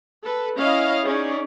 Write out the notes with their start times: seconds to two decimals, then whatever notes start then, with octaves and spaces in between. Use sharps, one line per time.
0.23 A4 B4
0.58 C#4 E4 D#5 F5
1.06 C#4 D#4 G#4 D5